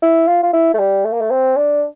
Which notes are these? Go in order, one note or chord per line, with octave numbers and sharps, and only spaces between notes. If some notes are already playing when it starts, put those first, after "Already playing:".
E4
F4
F4
E4
A3
G3
A3
A#3
A3
C4
D4